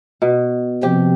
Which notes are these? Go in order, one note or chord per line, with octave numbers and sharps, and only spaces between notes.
B2
C3 F3 C4 G4